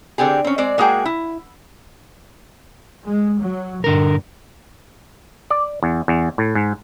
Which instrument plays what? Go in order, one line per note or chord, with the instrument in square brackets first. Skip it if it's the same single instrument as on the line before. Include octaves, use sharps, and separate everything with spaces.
[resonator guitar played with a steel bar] D3 C4 G4 G#4
C4 C#4
G#3 C4 D5
G#3 A#3 F#4 G#4 G5
E4
[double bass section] G#3
F#3
[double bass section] G2 A#2 [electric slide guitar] D3 A#4
[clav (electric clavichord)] D5
E2
E2
A2
G#2